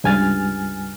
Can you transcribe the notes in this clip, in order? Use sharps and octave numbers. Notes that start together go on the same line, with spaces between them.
C#2 G2 G#5 F6 A6